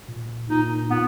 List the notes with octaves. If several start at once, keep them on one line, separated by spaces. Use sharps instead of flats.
A#2
A#2 D#4
A#2 B3